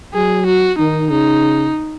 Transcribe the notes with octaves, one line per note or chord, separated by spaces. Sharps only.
F#3 G#4
F#4
D#3 D#4
C#3 D#4